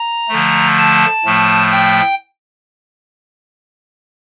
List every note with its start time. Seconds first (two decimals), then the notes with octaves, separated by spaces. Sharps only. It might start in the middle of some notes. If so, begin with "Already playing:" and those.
Already playing: A#5
0.29 D3 F3 A3
0.77 A5
1.25 A2 F3 A3
1.72 G5